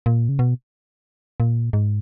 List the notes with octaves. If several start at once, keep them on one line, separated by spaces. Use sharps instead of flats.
A#2
C#3
B2
A#2
G#2